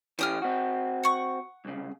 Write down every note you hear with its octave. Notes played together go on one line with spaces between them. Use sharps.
E3 C#4 G4 G5 D#6 F6
C4 F#4
F#5 C#6
C2 C#3